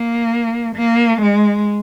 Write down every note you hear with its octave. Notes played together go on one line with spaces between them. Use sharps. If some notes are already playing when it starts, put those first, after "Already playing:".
Already playing: A#3
A#3
G#3